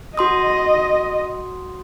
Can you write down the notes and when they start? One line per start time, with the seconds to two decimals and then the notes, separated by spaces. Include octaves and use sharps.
0.17 F#4 D#5 C6 D#6